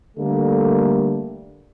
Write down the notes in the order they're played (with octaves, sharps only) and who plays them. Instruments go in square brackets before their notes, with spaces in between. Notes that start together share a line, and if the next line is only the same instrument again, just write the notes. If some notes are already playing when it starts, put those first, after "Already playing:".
[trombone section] D3 G3 A3 A#3